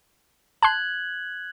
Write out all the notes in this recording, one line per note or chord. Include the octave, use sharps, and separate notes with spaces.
A5 C6 F#6 G#6 F#7